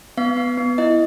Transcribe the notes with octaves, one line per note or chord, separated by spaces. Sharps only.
B3 F5
B3
B3
E4 D#5